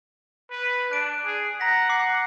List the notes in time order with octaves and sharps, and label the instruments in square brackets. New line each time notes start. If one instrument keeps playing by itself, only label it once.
[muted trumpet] B4
[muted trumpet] D4 [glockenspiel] F#6 D7
[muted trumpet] G#4
[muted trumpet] F#5 [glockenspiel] A#5 A#6 B6
[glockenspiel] D6 C7